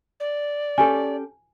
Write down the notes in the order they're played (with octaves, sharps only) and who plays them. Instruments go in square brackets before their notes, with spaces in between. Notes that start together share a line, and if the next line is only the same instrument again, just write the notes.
[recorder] D5
[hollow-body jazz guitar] C#4 G4 A4 [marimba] G#5